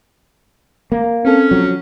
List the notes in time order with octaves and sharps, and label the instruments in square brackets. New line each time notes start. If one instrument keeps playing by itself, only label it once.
[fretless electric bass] A#3
[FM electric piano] C4 A4 [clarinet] C#4
[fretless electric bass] F3 F#3